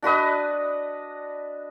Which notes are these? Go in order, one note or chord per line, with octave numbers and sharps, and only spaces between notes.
D4 F#4 B4 D#5